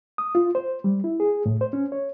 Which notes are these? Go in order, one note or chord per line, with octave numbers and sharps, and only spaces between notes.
D#6
F4
C5
G3
E4
G#4
A2
C5
C#4
C#5